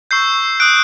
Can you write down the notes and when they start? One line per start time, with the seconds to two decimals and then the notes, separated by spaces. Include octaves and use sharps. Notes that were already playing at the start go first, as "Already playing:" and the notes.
0.11 C#6 E6 G6 C7
0.60 D#6 F#6 D7